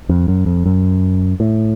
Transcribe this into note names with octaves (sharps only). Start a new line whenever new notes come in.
F2
F#2
F2
F#2
A2